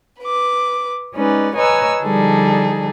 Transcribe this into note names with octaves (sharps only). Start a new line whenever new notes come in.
B4 D6
G#3 C#4 D#4 B4 D5
B4 C#5 D#5 G#5 A#5 E6
D3 F3 G3 D#4 G#4 A4